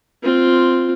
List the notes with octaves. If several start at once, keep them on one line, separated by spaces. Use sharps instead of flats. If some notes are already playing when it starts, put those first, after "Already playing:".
C4 F4